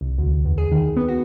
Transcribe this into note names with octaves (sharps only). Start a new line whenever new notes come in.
C2
D2
E2
G#4
D#3
B3
F#4